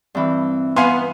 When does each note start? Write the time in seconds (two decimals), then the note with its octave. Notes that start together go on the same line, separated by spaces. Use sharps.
0.15 G2 E3 C4
0.76 B3 F5 G#5 C6